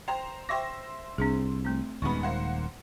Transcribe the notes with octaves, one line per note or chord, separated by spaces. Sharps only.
C5 G5 A#5
C5 E5 G5 C#6 D6 A#6
C2 C4 D4 G#4
A3 C4
D#1 F#2 D#3 G#3 B3 B5 C#6
A#3 C5 F#5